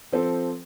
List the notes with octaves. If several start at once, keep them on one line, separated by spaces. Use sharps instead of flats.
F3 C4 A4